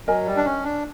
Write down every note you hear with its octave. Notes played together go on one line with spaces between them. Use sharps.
F#3 A#4 D#5 G#5
G3
D4
C#4
D4